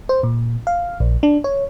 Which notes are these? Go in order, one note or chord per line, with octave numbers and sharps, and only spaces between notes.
C5
A#2
F5
A#1
D4
C#5